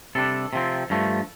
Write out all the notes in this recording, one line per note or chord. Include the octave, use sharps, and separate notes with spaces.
C3 G3 D4 A4
C3 F3 C4
G2 F3 A3